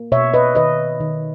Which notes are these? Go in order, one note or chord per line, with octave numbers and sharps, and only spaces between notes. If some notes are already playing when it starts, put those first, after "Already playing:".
Already playing: A#3
B2 C#5 E5
B4 D#5
D#3 B4 D#5
D#3